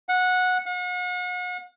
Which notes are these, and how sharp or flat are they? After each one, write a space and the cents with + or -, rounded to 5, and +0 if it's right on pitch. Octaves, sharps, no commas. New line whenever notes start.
F#5 -15
F#5 -40